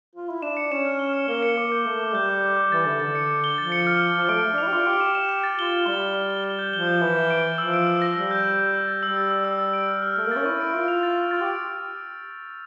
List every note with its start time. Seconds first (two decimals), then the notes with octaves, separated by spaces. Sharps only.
0.16 F4
0.30 E4
0.42 D4 E7
0.57 C#7
0.72 C#4 E7
0.85 F6
0.99 G7
1.13 C#7
1.28 A#3 G7
1.43 C#7
1.57 A#3 D6
1.72 G6
1.86 A3 D6
1.99 D6
2.14 G3 G6
2.29 D6
2.42 D6
2.57 D6
2.72 E3 A6
2.85 D3 A6
3.00 D3 A6
3.15 C#7
3.29 A6
3.44 G7
3.57 F3 A6
3.72 C#7
3.87 F6
4.01 F6
4.15 F3 F6
4.29 A3 D7
4.43 F6
4.53 D4
4.58 E4 F7
4.68 G4
4.72 F4 F6
4.86 G4 D7
5.01 E7
5.15 E7
5.29 E7
5.44 A6
5.58 F4 G7
5.72 G7
5.87 G3 G7
6.02 G7
6.15 G7
6.30 G7
6.44 G7
6.59 G6
6.73 F3 G7
6.87 G6
7.01 E3 E7
7.16 E7
7.30 D7
7.45 D7
7.58 F3 E6
7.74 D7
7.87 D7
8.02 A#6
8.16 G3 E6
8.31 G6
8.45 E6
8.60 E6
8.73 E6
8.87 A6
9.03 G3 E6
9.17 A6
9.31 E6
9.45 E6
9.59 A6
9.73 D7
9.87 F6
10.02 F6
10.16 A3 F6
10.26 A#3
10.31 C#4 A6
10.45 E4 C#6
10.60 D7
10.74 F4 D7
10.88 F7
11.03 A6
11.17 A6
11.31 F4 A6
11.41 G4
11.46 D7